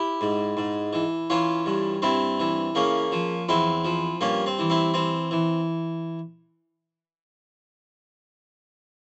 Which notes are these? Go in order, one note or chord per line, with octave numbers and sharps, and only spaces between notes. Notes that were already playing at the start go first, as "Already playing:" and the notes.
Already playing: E4 G4
G#2
G#2
E3
E3 C#4 F4
G2
G2 C4 E4
E3
C#3 A#3 C#4
F3
E2 C4 E4
F3
G2 A#3 C#4
C4
E3
C4 E4
E3 C4
E3